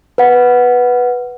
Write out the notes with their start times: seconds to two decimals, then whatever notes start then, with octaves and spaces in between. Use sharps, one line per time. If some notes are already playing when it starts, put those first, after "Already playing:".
0.18 B4 F#5